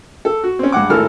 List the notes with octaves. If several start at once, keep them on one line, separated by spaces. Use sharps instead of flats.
A4
F#4
C4 C#4
G2 G#3 F#5 D6
G#1 A2 A4 A#4 F6